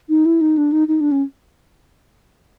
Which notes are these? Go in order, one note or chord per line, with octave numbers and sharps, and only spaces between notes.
D#4
E4
D#4
D4
D#4
D#4
D4
C#4